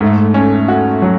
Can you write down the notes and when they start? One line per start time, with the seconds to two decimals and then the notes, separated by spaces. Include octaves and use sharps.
0.01 G#2 A3
0.34 C#4
0.68 F#4
1.02 F#3